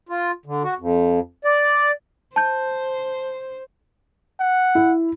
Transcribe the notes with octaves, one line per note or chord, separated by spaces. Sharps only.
F4
D3
F#4
F2
D5
C5 A5 G6
F#5
E4